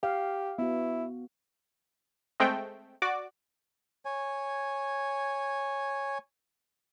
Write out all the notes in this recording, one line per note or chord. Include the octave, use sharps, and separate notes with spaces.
G4 F5
B3 E4 F#4
G#3 A3 C4 G5
F#4 D5 D6
C#5 G#5